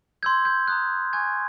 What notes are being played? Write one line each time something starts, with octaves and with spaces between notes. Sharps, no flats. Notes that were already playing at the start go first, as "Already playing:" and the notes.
C6 E6 G6 G#6
G6
A#5 D#6 F#6
G#5 C#6 F#6 G#6